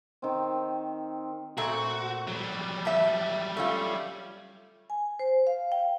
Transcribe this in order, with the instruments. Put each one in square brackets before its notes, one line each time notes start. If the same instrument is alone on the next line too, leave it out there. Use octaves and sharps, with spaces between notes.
[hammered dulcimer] D#3 C4
[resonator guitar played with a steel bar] A#2 A3 C4 [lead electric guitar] F#4
[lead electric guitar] F#3 G3
[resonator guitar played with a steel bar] F2 F3 E5
A3 C#4 F4
[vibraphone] G#5
C5
F5
G5